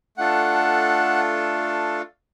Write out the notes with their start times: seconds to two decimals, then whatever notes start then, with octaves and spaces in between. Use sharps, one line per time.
0.17 A3 D4 F4 A4 F#5